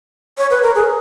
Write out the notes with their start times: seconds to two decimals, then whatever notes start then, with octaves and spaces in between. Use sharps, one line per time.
0.38 C#5
0.51 B4
0.63 A#4
0.75 G#4